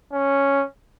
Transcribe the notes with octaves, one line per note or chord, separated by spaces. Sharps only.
C#4